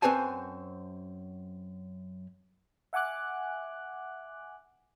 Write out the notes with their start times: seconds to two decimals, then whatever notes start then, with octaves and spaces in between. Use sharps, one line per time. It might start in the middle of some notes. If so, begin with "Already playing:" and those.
0.02 F#2 C4 B4 C5 G#5 A5
2.93 E5 F#5 G#5 D6 F#6